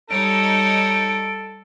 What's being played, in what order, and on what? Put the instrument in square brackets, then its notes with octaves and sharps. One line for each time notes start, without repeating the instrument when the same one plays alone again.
[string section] G3 D#4 C#5 [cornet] A4 [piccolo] D7